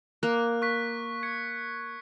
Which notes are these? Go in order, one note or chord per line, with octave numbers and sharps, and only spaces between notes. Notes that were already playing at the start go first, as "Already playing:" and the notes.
A#3 F#6
C#6 F#6 B6
G#6 C#7